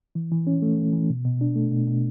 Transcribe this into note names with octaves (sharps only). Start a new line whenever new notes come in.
E3
E3
C#4
A3
E3
E3
B2
B2
D4
A3
B2
B2